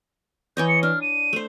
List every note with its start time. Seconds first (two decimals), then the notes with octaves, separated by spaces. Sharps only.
0.57 E3 C#5 D#5 G6
0.68 C#7
0.83 D4 F6
1.02 D#7
1.33 A3 C5